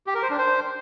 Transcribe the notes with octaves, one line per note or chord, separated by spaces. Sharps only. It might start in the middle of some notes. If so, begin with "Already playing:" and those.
G4
A#4
C5
D4
C5